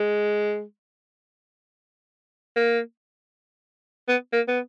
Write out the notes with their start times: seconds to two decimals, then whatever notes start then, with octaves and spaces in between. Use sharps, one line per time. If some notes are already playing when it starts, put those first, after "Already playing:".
Already playing: G#3
2.56 A#3
4.08 B3
4.33 A#3
4.48 B3